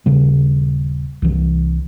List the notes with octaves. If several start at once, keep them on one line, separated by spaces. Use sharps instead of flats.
D#1 C#3 G3
C2 E3